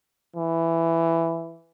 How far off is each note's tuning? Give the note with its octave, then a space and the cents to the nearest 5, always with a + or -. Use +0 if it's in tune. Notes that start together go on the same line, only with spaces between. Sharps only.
E3 +10